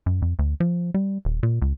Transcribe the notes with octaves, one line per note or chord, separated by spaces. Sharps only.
F#2
F2
D2
F3
G3
D#1
A#2
C#2